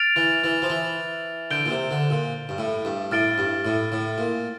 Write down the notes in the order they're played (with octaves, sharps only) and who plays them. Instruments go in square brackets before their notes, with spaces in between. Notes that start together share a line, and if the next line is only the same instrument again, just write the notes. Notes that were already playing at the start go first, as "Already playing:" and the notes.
Already playing: [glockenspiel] F6 A6 D7 F7
[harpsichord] E3
E3
F3
E3
[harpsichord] D3 [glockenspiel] G6 D7 G7
[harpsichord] A#2
C3
D3
A#2
G2
A2
G2
[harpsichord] A2 [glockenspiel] F6 A6 D7 G7
[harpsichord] G2
A2
A2
A#2